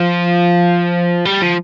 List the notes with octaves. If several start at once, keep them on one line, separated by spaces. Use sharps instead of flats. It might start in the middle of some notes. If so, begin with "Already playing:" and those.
Already playing: F3
G3
F3